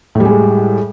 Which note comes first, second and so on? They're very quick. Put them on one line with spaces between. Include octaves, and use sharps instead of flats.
A2 G3 G#3